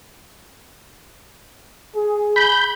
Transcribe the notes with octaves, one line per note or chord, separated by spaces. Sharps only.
G#4
B5 G6